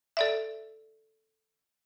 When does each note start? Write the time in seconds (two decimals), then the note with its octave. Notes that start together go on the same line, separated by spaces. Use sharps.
0.17 A4 D5 E5